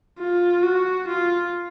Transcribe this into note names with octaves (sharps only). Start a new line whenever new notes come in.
F4
F#4
F4